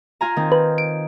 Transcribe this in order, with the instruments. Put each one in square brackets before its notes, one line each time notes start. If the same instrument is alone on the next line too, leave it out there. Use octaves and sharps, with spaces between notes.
[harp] F4 G#5 A#5
D#3 C4
[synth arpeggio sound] B4
D7